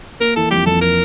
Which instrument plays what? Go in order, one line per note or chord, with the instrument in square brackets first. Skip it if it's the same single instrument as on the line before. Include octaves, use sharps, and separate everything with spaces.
[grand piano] A#3 [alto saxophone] A#4
[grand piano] E3 [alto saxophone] A4
[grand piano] F2 [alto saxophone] G4
[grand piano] F2 [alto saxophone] A4
[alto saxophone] A#4